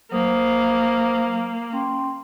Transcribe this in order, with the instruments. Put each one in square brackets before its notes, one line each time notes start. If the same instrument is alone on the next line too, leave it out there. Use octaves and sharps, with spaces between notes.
[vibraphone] F#3 C5 D#6 [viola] A#3
[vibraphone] C#4 G5 C6